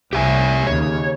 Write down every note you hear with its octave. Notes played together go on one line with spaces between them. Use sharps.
C2 G4 E5 G#5
D#2 C#3 C#5